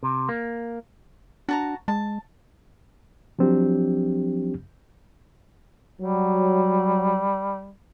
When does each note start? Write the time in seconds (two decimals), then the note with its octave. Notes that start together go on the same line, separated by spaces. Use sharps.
0.03 C3
0.29 A#3
1.49 D4 F#4 A5 A#5
1.88 G#3 A5
3.39 F3 F#3 C4 D4 G4
6.01 F#3 G3